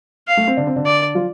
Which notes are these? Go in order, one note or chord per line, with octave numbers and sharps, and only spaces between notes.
F5
A3
C4
D3 D4
C4
D3 D4
D5
F3 F4